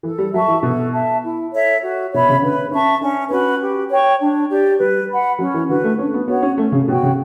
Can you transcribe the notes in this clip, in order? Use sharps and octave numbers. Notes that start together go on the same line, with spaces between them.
E3 A4
G3
F#3 E5 A5 C#6
E3
B2 A4
E5 A5
E4
A4 C#5 E5
F#4
B2 C#5 E5 B5
C#3
D3 B4
C#4 E5 A5 C#6
C#4 D4
C#4 F#4 B4
G4
C#5 G5 C#6
D4
G4 D5
G3 B4
F#5 B5
F#3 C#4
E3
D3 F#4 B4
A3
C#4 D4
B3
B3 F#4 C#5 F#5
C#4
A3 C#4
C#3
B2 F#4 C#5 G5
C#3